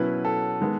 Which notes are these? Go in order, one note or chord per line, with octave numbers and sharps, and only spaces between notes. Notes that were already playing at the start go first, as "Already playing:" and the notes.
Already playing: B2 F#3 C#4 E4 B4
A4
D#3 G#3 B3